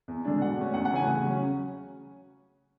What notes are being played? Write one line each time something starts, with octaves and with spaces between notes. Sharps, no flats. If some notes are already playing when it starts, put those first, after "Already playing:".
E2
D3 G#3 D4
B2 F#5
A3 C#4
E2 F#5
F#5
C#3 E3 A3 C#4 G#5
C#3
F#3 C#4